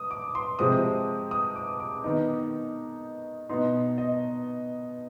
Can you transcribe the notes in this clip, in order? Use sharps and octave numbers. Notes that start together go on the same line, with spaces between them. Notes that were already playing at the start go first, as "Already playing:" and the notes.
Already playing: D#6
D6
C6
C3 F3 G#3 C4 D#6
D#6
D6
D6
D#3 B3 D#4
B2 B3 D#4 C6
D#5